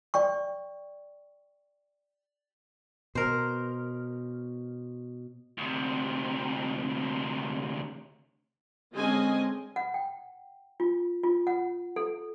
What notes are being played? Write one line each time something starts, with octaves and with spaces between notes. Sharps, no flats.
D5 G5 C#6
B2 A#4 C5
D2 C3
D3 G#3 C4 C#4 D#5 G#5
F#5
G5
F4
F4
F#5
A4